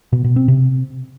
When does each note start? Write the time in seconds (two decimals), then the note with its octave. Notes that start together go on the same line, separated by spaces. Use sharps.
0.13 B2
0.24 B2
0.36 C4
0.48 C3